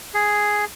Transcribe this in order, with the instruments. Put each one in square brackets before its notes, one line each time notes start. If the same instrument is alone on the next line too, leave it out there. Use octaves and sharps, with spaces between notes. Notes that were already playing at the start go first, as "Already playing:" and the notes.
[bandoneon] G#4